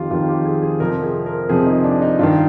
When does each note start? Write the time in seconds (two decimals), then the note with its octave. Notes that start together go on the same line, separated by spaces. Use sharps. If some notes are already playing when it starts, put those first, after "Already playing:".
Already playing: F2 D#3 F4 G4
0.11 F2 D#3 F4
0.28 G4
0.45 G#4
0.62 G#4
0.80 F2 C3 F3 A#4
1.03 G#4
1.26 A#4
1.49 F2 C3 F3 G#4
1.67 D#4
1.84 D4
2.02 D#4
2.19 G2 D#3 F4